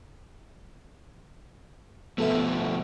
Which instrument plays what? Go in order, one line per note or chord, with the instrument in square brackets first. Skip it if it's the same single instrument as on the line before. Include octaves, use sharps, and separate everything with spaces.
[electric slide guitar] B2 F3 A3 [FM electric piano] B3 A4 E5